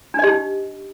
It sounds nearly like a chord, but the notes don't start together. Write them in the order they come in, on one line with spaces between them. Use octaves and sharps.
D4 D#5 G4 D#4